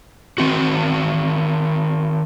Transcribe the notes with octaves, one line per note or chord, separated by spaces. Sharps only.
D#3 C4 F#4